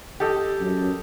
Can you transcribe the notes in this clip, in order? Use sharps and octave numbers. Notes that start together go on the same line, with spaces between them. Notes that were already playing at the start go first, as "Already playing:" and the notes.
G4 A4 D#5
F#2